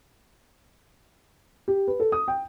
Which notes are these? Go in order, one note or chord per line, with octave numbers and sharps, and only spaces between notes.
G4
B4
A4
D#6
G5